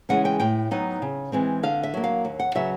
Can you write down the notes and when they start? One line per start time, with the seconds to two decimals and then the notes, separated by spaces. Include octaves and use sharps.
0.09 C#3 E3 G#3 C#4 F#5
0.25 G5
0.40 A2 G5
0.71 F#3 B3 D#4
1.02 C#3
1.32 E3 G#3 C4
1.63 D3 F5
1.83 E5
1.94 F#3 A#3
2.04 F5
2.25 D#2
2.39 F#5
2.55 C#3 F#3 B3 E5